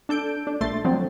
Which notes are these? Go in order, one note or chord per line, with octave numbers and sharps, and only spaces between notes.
D4 A4 G6 D7
D4
A#1 A3 C6 A6
D3 F3 F#3 C4